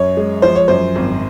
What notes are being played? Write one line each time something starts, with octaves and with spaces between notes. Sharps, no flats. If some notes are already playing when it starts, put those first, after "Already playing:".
Already playing: F#2 C#5
G#3
F3 C5
C#5
F#2 C5
G#1